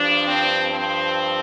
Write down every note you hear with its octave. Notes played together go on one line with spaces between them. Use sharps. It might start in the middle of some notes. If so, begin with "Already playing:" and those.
Already playing: G2 F3 D4
C4
C4